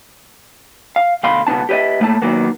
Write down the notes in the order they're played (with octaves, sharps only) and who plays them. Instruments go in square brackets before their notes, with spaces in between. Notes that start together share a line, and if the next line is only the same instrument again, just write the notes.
[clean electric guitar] F5
D2 B2 F5 B5 C6
C#2 B2 B3 C#4 A5
G4 B4 C5 D#5 E5
A2 A3 A#3 E5 A5
D#3 F#3 A#3 B3